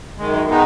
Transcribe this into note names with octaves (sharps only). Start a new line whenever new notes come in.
F#2 D#3 G#3
D#3 G#3 B3 D#4